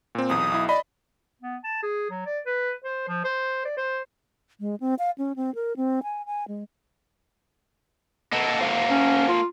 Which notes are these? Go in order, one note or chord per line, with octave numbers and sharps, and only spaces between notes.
A#2 C4
B1 E2 D#6
B1 E4
D5 D#5 B5
B3
A5
G#4
F#3
D5
B4
C5
F3
C5
D5
C5
G#3
C4
F5
C#4
C4
A#4
C4
G#5
G#5
G#3
A#3 A4 D#5 F#5
C5 F5 F#5
C#4
F4